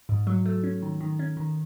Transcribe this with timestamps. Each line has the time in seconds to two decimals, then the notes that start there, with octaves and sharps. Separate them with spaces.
0.09 G#2
0.27 F#3
0.46 A3
0.63 C#4
0.82 D#3
1.01 D#3
1.19 C#4
1.37 D#3